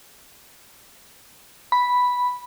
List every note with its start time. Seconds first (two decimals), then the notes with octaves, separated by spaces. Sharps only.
1.72 B5